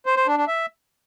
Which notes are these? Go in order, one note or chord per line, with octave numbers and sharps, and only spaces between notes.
C5
C5
D4
D4
E5